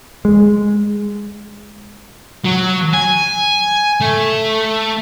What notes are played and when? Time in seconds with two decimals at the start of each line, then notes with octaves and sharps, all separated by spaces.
0.25 G#3
2.45 F#3
2.94 G#5
4.01 A3